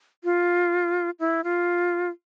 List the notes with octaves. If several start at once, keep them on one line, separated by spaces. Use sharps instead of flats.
F4
E4
F4